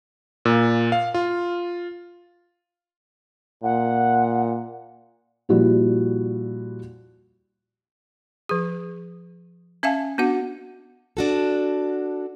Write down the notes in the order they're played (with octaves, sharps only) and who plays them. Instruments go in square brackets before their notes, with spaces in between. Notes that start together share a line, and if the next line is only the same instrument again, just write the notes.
[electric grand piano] A#2
F5
F4
[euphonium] A#2 [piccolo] F#5
[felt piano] A#2 F3 G3 E4 F#4
[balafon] F3 G#4
C#4 E5 F5 G#5 A5
B3 D4 F#4 F#5
[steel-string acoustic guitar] D4 F#4 A4